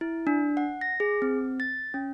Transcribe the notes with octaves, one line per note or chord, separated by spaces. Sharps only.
E4
D4
F#5
A#6
G#4
C4
A6
C#4